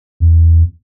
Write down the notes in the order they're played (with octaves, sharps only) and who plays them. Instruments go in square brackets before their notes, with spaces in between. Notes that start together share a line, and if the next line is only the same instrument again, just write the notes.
[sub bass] E2